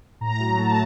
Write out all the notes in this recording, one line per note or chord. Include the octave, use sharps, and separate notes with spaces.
A2 A#5
F#3
A3 A5